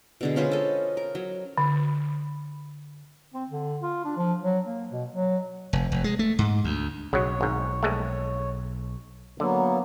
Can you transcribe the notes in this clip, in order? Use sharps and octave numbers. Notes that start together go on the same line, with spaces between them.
B2 D3 G#3
C#4 F4 B4 C5
A4 D#5
A#4
F#3
D3
C4
D3
F4
D4
F3
F#3
A#3
B2
F#3
F1
F1
G#3
A3
G#2
D2
B1 C#3 F#3 C#5
G#1 G#2
A#1 G#3 A3
D3 F#3 A#3 B3